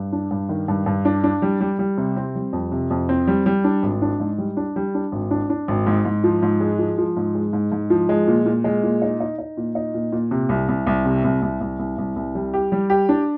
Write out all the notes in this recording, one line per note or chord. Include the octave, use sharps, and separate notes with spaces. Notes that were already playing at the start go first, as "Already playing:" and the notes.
Already playing: G2
D4
G2
D#3
G2
G2
D4
D4
G3
G3
G3
C3
C4
G3
F2
C3
F2
C4
G3
G3
D4
G#1
D4
G#2
G3
D4
G3
D4
G#1
D4
D4
G#1
G#2
G#2
F3
G#2
G#3
F3
F3
G#2
G#3
G#2
G#2
F3
G#3
A#2
A#2
G#3
A#2
D#4
D#4
D#4
A#2
D#4
A#2
A#2
C3
C2
C2
C2
C3
C2
C2
C2
C2
C2
C2
G3
G4
G3
G4
D4